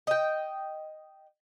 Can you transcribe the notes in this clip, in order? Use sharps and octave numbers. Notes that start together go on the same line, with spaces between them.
D#5 G5